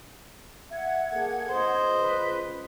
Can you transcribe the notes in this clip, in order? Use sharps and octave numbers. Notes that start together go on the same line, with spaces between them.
E5 F#5 G#6
A#3 G#4 A4
C#2 C5 D#5
B4